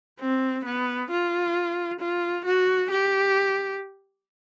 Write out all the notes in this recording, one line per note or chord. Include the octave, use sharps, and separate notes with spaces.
C4
B3
F4
F4
F#4
G4